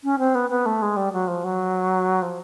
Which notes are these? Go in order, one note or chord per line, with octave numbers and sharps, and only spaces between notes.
C#4
C4
B3
B3
A3
G#3
G3
F#3
F3
F#3
F3